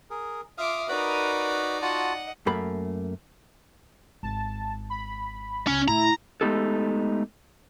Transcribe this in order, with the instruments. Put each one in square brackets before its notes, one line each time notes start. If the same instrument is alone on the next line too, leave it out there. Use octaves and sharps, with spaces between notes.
[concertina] G#4 A#4
[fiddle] F4 D6 [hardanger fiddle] E5 [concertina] F5 D#6 F6
[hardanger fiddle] D#4 D5 [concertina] F#4 B4 B5 [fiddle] A#4 D#6
[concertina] F4 F#4 A5 [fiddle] D#5 F#5
[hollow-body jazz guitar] F#2 A3 A#3 B5
[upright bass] G#1 [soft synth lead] A5
[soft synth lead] B5
[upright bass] C#2 [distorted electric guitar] C#4
[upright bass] A2 D3 [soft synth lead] E4 [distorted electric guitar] A#5
[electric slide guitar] G#3 A3 B3 D#4 G4 A4